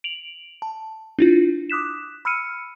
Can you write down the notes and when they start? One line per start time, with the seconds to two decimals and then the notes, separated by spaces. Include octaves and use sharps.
0.04 D7 F7 F#7
0.62 A5
1.19 D4 E4 F4
1.70 D6 D#6 F#6 B6 E7
2.25 B5 E6 F6 C#7 D#7